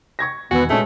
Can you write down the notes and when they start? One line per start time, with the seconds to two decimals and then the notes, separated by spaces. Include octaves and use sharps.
0.19 C#6 G#6 A#6
0.51 E1 E2 D#3 B3 F#4 G#5 E6
0.70 A#2 G#3 A3 C#4 A5